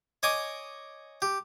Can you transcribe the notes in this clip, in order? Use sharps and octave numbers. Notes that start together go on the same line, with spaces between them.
C#5 D#5 G#5 D6
G4